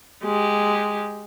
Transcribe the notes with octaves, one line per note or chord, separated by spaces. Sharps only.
G#3 G4